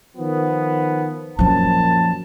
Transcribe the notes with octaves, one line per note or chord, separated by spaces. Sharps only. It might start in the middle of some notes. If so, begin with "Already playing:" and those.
D#3 F3 B3
F#2 A#2 F3 F#3 A5